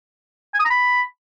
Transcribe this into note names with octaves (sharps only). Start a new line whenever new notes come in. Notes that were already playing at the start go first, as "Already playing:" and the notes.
G#5
D#6
A#5
B5